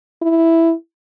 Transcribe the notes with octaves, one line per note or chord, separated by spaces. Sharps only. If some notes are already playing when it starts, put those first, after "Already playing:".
E4